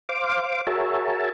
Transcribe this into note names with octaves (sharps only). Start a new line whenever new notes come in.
C5 F5 D6
F#4 G#4 A#4 C#5 E5 A5